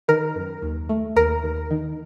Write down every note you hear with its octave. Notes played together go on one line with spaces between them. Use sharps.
D#3 A#4
F#2
D#2
A3
D#2 A#4
D#2
D#3